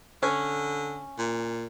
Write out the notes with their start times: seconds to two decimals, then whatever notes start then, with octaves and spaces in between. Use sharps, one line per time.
0.23 D3 C#4
1.18 A#2